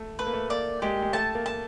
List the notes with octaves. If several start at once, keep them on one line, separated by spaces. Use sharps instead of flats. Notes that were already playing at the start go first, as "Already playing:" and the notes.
Already playing: A3
A3 B4
A#3
A3
A#3 D5
G#3 G4
G#3
A3 A5
A#3
A5